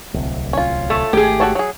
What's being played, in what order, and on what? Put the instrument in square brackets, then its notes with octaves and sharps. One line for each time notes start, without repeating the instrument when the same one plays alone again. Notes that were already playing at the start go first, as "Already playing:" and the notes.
[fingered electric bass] D1 C2
[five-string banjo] C#4 F4
[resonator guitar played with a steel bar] A3
[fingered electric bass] G#1 A3 [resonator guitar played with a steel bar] G4 G#4
[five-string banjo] F#4 A4 C#5
F#3 G#4